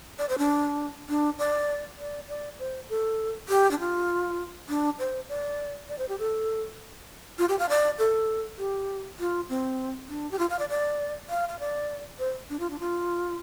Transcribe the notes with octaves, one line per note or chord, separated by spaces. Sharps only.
D5
C5
D4
D4
D5
D5
D5
C5
A4
G4
D4
F4
D4
C5
D5
D5
C5
G4
A4
F4
G4
F5
D5
A4
G4
F4
C4
D4
G4
F4
F5
D5
D5
F5
F5
D5
C5
D4
F4
D4
F4